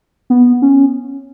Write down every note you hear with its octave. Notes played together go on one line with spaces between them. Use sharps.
B3
C#4